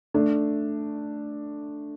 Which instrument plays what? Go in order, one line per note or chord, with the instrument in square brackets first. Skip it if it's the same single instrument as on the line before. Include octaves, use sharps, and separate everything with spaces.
[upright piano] A3 D4